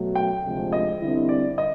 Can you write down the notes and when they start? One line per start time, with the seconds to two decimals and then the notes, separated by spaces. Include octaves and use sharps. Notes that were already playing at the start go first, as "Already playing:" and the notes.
Already playing: B2 F#3 A3
0.15 G5
0.44 D2 C3 F3 G#3
0.73 D#5
1.01 D3 G3 C4 E4
1.29 D5
1.58 D#5